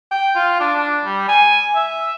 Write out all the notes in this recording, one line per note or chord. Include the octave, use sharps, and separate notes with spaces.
G5
F4
D4
D4
G3
G#5
E5